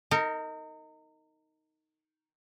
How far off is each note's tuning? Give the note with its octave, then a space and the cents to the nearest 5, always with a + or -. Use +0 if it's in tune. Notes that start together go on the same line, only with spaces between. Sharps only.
D#4 +10 A#4 -30